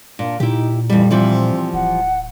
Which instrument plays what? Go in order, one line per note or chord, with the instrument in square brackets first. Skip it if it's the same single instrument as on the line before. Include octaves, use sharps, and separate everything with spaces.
[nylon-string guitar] A#2 [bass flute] D4
[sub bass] A#2 [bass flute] D#4 [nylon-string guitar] E4 G4
[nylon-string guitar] F2 G3 [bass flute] E3
[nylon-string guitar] E3 F3 G3 [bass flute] C4
[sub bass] D1 [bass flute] F#5